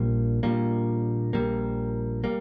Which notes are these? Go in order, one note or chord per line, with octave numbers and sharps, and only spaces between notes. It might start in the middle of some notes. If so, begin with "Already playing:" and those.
Already playing: A#1 A#2 G3 A#3
A#1 A#2 G3 A#3
A#1 A#2 G3 A#3
G3 A#3